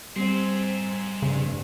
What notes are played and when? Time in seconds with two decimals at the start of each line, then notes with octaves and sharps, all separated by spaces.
0.16 G3 C4 G#4 C5
1.22 F1 G2 C#3